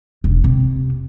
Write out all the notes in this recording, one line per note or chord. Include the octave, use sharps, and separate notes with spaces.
E1
C3